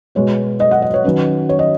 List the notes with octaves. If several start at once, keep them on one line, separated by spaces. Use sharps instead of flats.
B2 G#3 B3 C#5
D#5
F#5
D#5
C#5
D#3 F#3 C#4 B4
C#5
D#5